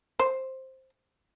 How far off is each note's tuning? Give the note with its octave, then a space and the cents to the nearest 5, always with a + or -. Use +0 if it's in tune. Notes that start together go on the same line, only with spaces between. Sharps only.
C5 +5